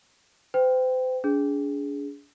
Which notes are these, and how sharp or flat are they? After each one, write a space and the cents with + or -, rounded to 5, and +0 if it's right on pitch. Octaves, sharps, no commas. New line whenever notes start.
C5 -40 G5 -5
D4 -40 G#4 +0